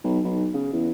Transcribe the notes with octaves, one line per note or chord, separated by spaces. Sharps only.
B1
B1
C#3
E2